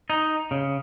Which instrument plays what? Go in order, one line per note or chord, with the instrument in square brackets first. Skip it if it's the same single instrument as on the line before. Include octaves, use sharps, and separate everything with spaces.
[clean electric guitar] D#4
C#3